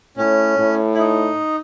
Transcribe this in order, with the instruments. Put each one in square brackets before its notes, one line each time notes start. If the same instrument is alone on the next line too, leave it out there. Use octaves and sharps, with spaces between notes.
[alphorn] A2 [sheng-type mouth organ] C#4
[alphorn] A2
[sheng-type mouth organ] E4
D#4